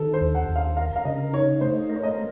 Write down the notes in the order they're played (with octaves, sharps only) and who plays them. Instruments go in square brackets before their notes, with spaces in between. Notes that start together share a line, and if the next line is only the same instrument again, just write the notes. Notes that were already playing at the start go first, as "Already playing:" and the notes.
Already playing: [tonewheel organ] D#3 [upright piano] A4
[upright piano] C5
[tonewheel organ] D#2
[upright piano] F#5
[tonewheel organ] D#2
[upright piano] F5
[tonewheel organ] A#4 [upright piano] F5
[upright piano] F5
[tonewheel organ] C#3 [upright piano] D#5
[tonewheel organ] D#4 [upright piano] C#5
[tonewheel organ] A3 [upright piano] C5
[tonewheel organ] A#4
[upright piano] C#5
D#5